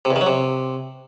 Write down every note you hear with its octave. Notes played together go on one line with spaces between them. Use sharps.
C3
E2
D#3
F#3
C3